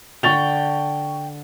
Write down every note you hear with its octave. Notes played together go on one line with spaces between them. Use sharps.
D3 G5 C#6 A6 F7